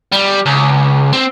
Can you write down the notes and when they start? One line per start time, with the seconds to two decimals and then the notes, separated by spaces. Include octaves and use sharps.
0.12 G3
0.46 C#2
1.13 C4